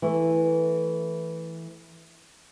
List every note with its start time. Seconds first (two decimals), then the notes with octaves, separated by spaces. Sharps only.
0.02 E3 A3